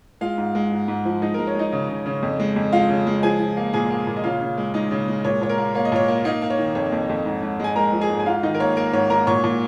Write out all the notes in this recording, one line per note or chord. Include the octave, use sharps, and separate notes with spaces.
G#3 F4 F5
G#2
G#3
G#2
G#2
F3
G#3 D#4 D#5
A#4
G#3
C#5
G#3 D#4 D#5
C#3
C#3
C#3
F2
G#3
F2
G#3 F4 F5
C#3
G#3
F3 G#4 G#5
F3
A#3
A#2 G#4 G#5
A#3
A#2
D#5
C#3 F4 F5
C#3
G#3
G#3 D#4 D#5
C#3
G#3
A#2 C#5
A#2 C#5
A#4
A#3
A#3 C#5
D#5
A#2 C#5
A#3
A#3 D#4 D#5
A#3
C#5
D#3
F2 C#5
F2
F2
G#2
G#2
G#3 G#5
G#3 A#4 A#5
F3
G#4 G#5
G#2
G#5
G#2 F4 F5
D#3 D#4 D#5
A#4
A#3 C#5
A#3 A#4
G#2 C#5
G#2 A#4 A#5
A#2 C#5 C#6
A#2